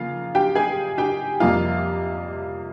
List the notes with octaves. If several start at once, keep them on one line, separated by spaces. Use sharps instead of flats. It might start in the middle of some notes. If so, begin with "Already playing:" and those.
Already playing: C#3 F3 A#3 F4 F5
G4 G5
G#4 G#5
G4 G5
F2 C3 G3 A#3 F4 F5